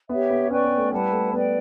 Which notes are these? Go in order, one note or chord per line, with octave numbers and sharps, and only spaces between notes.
B3 G4 C#5 E5
B3
C#4 B4 D5 G5 C#6
B3
A3
G3 E4 B4 F#5 A5
A3
B3 B4 D5 G5